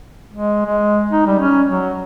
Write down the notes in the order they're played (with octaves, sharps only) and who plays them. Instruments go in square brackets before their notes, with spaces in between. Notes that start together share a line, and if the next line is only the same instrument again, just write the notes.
[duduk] G#3
G#3
D#4
G3
C#4
F#3